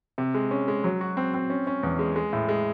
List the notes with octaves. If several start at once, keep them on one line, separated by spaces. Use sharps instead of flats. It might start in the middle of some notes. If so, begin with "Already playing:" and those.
C3
G#3
C#4
G#3
F#3
F#4
C4
C4
C#4
C#4
E2
G#3
G#3
A2
G#3